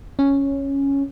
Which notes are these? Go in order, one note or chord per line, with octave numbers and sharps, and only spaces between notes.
C#4